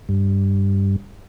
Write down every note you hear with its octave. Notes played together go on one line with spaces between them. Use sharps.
G2